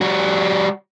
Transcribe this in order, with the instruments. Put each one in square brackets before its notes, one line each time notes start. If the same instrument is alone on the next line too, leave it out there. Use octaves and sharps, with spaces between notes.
[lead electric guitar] G3 F#4